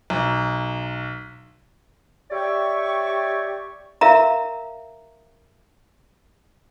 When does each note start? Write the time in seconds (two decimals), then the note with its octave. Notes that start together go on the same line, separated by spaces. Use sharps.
0.10 B1
2.31 G4 C#5 D5 E5 G5 C#6
4.01 A#4 E5 F5 A#5